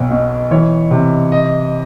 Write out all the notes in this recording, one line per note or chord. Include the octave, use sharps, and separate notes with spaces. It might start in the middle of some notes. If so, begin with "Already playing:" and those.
Already playing: B1 B2 C#5
B2
E3 C#5
C3
D#5